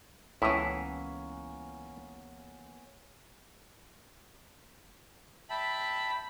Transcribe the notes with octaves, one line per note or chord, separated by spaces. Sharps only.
C#2 A2 E3 A#3 B3 C#4 E4
E5 G5 A5 B5